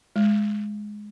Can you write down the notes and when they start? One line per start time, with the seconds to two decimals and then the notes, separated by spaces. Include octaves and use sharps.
0.16 G#3